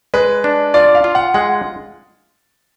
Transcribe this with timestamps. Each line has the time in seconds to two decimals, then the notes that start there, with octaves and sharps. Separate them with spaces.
0.14 G#3 B4
0.44 D4
0.74 F4 D5
0.95 F5
1.04 F4
1.15 F#5
1.34 G#3 F#5